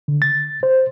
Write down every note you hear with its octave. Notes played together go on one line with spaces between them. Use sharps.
D3
A6
C5